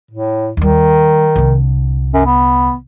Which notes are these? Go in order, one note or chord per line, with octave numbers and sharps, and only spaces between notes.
A2
D#2 D#3 G3
C2 D3
F#2
B3